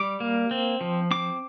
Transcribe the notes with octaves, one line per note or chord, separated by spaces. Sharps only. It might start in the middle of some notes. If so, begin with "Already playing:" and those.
Already playing: G3 D6
A#3
C4
F3
C4 D6